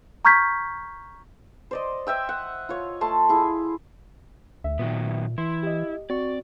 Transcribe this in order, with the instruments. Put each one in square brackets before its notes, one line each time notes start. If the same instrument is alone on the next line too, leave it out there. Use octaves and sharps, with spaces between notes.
[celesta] A#5 C#6 F6 G6 G#6 B6
[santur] C5 D5 D#5
D#5 E5 G5 E6
F#5
F4 C#5
A3 A5 C6
E4 G#4
[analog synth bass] D2 [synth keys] E5
[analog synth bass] A#2 [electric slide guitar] D#3 F#3 B3
[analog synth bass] E3 [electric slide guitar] E4 [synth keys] C6
[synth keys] G4 D#5
[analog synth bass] C4 [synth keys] F#4 C#6 [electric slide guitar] D5